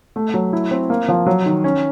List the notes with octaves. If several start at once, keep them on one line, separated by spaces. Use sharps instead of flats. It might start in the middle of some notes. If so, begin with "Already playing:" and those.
A3
F#3
E4
C4
A#3
F3
F#3
D#3
C#4